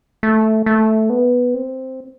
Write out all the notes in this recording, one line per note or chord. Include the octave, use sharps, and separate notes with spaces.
A3
A3
B3
C4